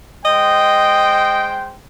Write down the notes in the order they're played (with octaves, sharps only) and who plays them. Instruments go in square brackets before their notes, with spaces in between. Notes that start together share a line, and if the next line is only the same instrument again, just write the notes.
[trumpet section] G#3 C5 G5 [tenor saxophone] D#5